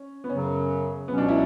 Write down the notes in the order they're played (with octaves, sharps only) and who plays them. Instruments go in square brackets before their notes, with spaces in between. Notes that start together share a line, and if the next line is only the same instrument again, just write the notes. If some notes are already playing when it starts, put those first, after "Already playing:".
Already playing: [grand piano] C#4
B3
[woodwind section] F#2 C#3 F#3 [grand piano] C#4
[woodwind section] C#2 B2 F#3 C#4 [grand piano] B3
[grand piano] D4
E4